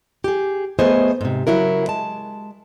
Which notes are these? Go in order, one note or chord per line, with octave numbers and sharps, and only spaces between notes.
G4 G#4
F#3 A3 B3 G#4 C5 D#5
G#2 C3
C#3 F#3 E4 A#4
G#3 A5